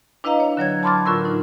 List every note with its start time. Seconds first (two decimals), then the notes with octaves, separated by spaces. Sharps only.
0.24 D4 E4 B4 D#5 F5 A#5
0.40 C#5
0.57 D3 F#3 C#5 G#6
0.83 A5 B5 C6 D6 F6 A6
1.06 A2 D3 F4 A#4 C#6 E6
1.25 D#4